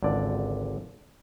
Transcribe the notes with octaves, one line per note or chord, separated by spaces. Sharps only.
G#1 C#2 D3 D5